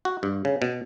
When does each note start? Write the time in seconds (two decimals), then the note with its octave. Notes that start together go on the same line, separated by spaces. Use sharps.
0.05 F#4
0.23 G2
0.45 C#3
0.62 B2